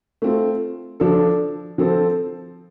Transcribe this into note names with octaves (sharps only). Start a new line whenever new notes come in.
A3 C4 F4
F3 D4 A4
F3 C4 A4 C5